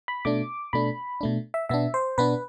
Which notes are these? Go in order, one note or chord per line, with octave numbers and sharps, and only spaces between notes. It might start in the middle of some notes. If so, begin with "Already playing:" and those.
B5
B2 A3 D4 D6
B2 A3 D4 B5
B2 A3 D4
E5
B2 B3 D4 E5
C5
B2 B3 D4 B4